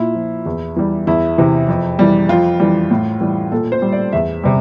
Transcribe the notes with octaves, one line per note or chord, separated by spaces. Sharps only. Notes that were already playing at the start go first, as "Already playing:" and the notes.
Already playing: A#2 E4
F3
E2
E3 G3
E2 E4
C3 E3
F2
E3 G3
F2 F4
E3 G3
A2
E3 G3
A#2 A4
C5
G3
D5
E2 E5
C3 G3